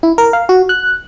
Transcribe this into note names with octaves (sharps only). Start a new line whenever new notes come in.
E4
A#4
F5
F#4
F#6